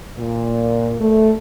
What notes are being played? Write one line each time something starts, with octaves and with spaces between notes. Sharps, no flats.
A#2
A3